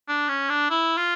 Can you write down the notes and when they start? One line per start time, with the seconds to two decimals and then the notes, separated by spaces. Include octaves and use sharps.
0.08 D4
0.28 C#4
0.49 D4
0.70 E4
0.97 F4